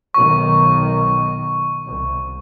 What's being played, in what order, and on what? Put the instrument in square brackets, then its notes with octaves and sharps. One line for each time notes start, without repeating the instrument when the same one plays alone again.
[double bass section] B1 D#3 [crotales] C#6
[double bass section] C2